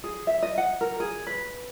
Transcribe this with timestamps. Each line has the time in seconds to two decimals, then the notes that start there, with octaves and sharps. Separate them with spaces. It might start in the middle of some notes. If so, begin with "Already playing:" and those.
0.04 G#4
0.27 E5
0.42 D#5
0.58 F#5
0.81 A#4
1.00 G#4
1.27 B4